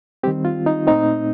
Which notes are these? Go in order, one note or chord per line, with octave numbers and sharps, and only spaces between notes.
D#3 G3 C4 G4
F4
D#4
A#2 A3 C4 D#4